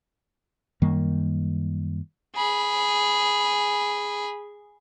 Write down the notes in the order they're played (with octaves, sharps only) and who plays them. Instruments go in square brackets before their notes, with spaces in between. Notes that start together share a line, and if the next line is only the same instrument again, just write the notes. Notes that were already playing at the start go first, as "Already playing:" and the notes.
[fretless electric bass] F#2 D#3 G3 A#3
[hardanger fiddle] G#4 B5